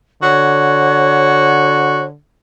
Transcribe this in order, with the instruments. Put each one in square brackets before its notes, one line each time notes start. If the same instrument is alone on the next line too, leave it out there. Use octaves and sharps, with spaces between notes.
[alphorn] D3 [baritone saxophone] F#4 [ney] C#5